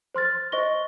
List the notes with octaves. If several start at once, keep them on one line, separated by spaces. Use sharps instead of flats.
C5 C6 F6 A6
C5 D#5 C#6 A#6 G7